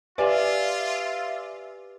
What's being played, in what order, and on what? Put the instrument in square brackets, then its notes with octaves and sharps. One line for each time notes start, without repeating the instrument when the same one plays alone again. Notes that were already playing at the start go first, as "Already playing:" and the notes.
[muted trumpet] F4 [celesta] G4 B4 [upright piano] D5 G#5 [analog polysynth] E5 F5